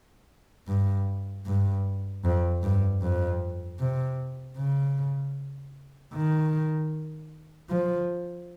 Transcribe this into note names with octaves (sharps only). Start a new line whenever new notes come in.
G2
G2
F2
G2
F2
C3
C#3
D#3
F3